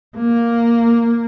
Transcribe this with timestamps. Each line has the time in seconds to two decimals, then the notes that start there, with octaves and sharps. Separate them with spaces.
0.17 A#3